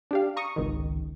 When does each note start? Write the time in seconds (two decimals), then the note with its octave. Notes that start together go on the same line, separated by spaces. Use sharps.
0.11 D4 G4 F5
0.37 A#5 C#6 D#6
0.56 G#1 C#2 D#3